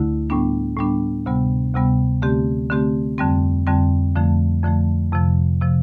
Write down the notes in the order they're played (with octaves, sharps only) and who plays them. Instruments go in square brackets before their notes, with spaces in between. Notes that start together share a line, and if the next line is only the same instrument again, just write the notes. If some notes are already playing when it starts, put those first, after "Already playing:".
Already playing: [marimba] D2 D3 A3 E4
A2 G3 B3 D4
A2 G3 B3 D4
D2 C3 G3 B3
D2 C3 G3 B3
D3 A3 C4 G4
D3 A3 C4 G4
F2 D3 G3 C4
F2 D3 G3 C4
F2 D3 F3 A3
F2 D3 F3 A3
F2 C3 F3
C3 F3